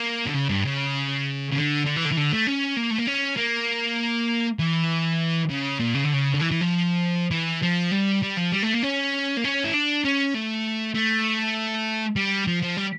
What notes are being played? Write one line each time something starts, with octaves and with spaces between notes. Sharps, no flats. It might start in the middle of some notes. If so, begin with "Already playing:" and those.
Already playing: A#3
D3
C#3
G2
C#3
C#3
D3
D3
E3
D3
E3
D3
A3
C#4
A#3
A3
A#3
C#4
A#3
E3
C#3
A#2
C#3
D3
C#3
D3
E3
E3
F3
E3
F3
G3
G3
F3
G3
A3
A#3
C#4
A#3
C#4
E4
D4
C#4
A3
A3
G3
F3
F3
G3